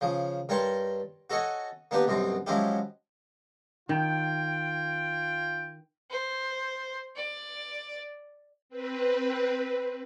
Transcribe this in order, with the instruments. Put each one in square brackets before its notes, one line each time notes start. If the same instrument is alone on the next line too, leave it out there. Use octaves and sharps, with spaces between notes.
[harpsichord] C#3 F3
G2 A#4 C#5 G5 A5 C6
F#4 A4 C#5 D#5 G#5
A#3 B3 D4 G4 B4
C2 F#2 B2 C4
F3 F#3 G#3 C#4 E4 G4
[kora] D#3 [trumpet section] F4 G5
[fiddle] C5
D5
[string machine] C4 B4